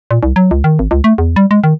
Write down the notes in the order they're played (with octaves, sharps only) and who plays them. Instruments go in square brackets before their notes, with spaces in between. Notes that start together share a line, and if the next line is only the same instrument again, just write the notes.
[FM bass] A#2
C2
F#3
C#2
D#3
G#1
C#2
A3
E2
G3
G#3
D#3